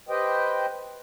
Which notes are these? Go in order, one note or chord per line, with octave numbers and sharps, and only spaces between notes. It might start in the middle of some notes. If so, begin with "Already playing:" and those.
G4 B4 C5 D#5 G5